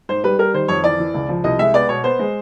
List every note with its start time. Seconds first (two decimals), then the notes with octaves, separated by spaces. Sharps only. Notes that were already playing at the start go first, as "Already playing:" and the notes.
0.09 G#2 C5
0.24 G3 B4
0.39 G3 A#4
0.54 D#3 C5
0.68 F2 C#5
0.84 E3 D5
0.99 E3
1.14 C#2
1.29 F3
1.44 C2 D#5
1.59 G#3 E5
1.74 B3 D5
1.89 B2 C#5
2.04 B3 C5
2.19 G#3